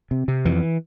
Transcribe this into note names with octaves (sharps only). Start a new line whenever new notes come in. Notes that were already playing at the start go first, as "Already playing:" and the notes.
C3
C3
F2 E3